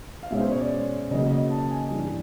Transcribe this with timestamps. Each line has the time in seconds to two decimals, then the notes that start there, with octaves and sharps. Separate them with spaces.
0.23 F5
0.31 B2 G#3 C#4 E5
0.41 C5
0.52 C#5
0.61 D5
1.11 C#3 F#3 A#3 D#5
1.31 D#5
1.50 A5
1.71 G#5
1.91 G2 E3 G3